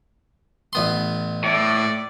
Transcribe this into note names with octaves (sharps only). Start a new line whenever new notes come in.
A1 B3 C6
A2 D5